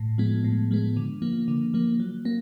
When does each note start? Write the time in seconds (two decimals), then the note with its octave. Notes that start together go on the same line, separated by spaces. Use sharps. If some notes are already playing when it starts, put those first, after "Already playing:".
Already playing: A2
0.18 F3 G#3 B3
0.44 A2
0.71 F3 G#3 B3
0.97 D3
1.22 F3 A#3
1.48 D3
1.74 F3 A#3
2.00 F#3
2.25 A#3